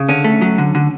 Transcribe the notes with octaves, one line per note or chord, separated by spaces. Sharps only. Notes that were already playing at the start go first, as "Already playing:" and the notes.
Already playing: C#3
D3 C#4
A3
F#3
D3
D3